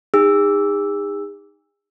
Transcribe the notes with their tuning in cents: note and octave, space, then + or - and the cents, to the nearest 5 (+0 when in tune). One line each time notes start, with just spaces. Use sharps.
D#4 -10 G#4 -40 E6 +0